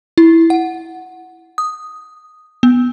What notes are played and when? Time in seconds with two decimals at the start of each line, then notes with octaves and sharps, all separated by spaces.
0.18 E4
0.50 F#5
1.58 D#6
2.63 B3